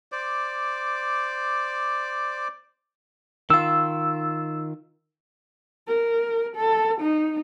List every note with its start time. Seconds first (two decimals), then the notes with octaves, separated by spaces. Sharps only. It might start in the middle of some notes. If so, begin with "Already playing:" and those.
0.12 C5 D5 D6
3.50 D#3 F4 E6
5.88 A#4
6.56 A4
7.01 D#4